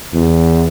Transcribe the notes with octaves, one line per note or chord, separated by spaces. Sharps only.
E2